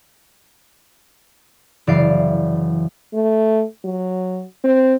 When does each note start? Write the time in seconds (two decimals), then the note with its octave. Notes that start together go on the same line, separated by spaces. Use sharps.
1.87 F#1 E3 D5 F5 C7 D7
3.14 A3
3.85 F#3
4.64 C4